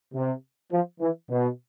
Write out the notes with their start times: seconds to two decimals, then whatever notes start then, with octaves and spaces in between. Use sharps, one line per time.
0.14 C3
0.72 F3
1.00 E3
1.30 B2